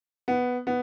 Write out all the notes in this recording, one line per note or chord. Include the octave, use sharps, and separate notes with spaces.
B3
B3